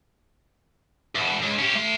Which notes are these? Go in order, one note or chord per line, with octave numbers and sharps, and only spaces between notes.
E2 B2
C#2
C#4 G4
A3 C6